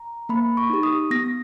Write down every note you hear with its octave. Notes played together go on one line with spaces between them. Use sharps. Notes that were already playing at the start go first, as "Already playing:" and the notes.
Already playing: A#5
A#3 B5
C#6
D#4 G4
D#6
B3 A#6